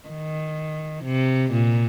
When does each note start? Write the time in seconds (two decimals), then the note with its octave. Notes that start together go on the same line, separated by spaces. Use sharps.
0.09 D#3
1.04 C3
1.52 A#2